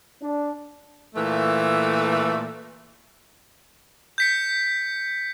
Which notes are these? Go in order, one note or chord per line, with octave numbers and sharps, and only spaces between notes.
D4
A#2 E3 A3
G6 B6 C#7